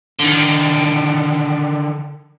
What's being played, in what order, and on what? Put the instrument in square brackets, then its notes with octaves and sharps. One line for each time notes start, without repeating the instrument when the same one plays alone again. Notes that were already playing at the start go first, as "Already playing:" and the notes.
[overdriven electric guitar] D3 D#3